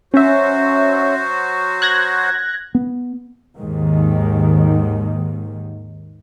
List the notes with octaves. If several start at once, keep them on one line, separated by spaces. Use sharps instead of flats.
F#3 C#4 F#4 C5 E5
F#6 G#6 A#6
B3
D#2 G#2 D#3